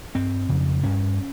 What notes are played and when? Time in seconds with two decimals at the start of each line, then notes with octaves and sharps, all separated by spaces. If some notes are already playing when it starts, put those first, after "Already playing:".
0.15 G2 C4
0.49 F2 C#3
0.84 G2 C#4